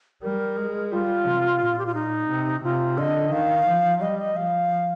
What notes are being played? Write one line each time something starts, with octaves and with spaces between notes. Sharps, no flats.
G3 A#4
G#3
G3 F4
C3
A#2
G4
F4
D#4
C3
C3 F4
D3 D#5
D#3 F5
F3
G3 D#5
D#5
F3 F5